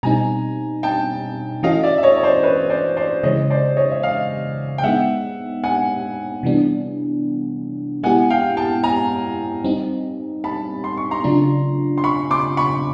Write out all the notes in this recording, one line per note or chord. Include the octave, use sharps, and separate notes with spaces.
B2 G3 C4 D#4 G#5 A#5
G5 A5
E3 A3 C#4 F#4 A4 D#5 F5
D5 E5
E5
C#5 D#5
C#5
C5 D5
B4 C#5
C5 D5
C5 D5
C#3 E3 G#3 C#5 D#5
C5 D5
C#5 D#5
E5
D#5 F5
G5
G#3 B3 D#4 E5 F#5
F#5 G#5
C3 E3 G3 B3 D4
G#3 B3 E4 G4 F#5 G#5
F5 G5
G5 A5
G#5 A#5
G3 C4 D#4
A5 B5
C6
C#6
A#5 C6
C#3 F#3 A3 D4 F4
C6
B5 C#6
C6 D6
B5 C#6